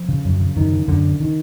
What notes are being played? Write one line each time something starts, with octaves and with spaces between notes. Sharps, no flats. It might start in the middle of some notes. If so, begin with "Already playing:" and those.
Already playing: F3
C#3
F#2
C#3
F#2 D#3
C#3
F#2 D3
C#3
D#3